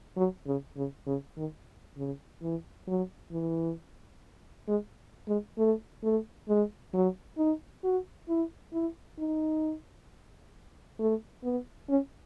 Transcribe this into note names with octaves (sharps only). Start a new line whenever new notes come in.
F#3
C#3
C#3
C#3
D#3
C#3
E3
F#3
E3
G#3
G#3
A3
A3
G#3
F#3
D#4
F#4
E4
E4
D#4
A3
B3
C#4